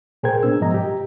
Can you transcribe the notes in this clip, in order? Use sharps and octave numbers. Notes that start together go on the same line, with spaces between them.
A#2 G#4 A#4 C5 G5 G#6
B3 D4 E6
G#2 F3 D#5 A#5
G4